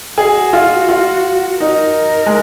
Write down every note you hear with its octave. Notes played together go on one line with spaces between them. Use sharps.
F#4 G#4
F4
F4
D#4 A#4
G#3